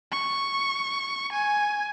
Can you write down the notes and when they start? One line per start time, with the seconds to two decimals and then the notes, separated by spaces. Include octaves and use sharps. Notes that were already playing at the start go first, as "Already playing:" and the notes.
0.12 C#6
1.32 G#5